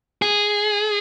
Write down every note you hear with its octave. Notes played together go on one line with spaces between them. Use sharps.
G#4